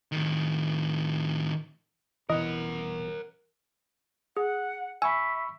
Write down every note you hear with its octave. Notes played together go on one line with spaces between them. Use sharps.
A2 D#3
F1 B2 E3 A#4 D#5 F#5
G#4 F#5
E5 G#5 B5 C#6 E6